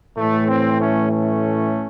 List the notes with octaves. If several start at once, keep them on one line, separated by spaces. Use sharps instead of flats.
A2 E3 A3
C4
A3 C#4
A3 C#4